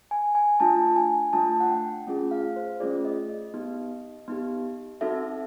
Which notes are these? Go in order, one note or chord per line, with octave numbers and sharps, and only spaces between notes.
G#5
G#5
A3 D4 F4 A5
G#5
A3 D4 F4 A5
F#5
G5
A3 C#4 F4 G#4
F5
C5
A3 C#4 F4 G#4 D5
D#5
D#5
B3 D#4 G4
B3 D#4 G4
C4 D#4 F#4 A4 E5